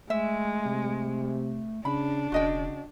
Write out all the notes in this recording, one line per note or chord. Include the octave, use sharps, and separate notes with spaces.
G#3 A3 E5
C3
C#3 D4 B5
E1 C#3 F#4 D#5 G5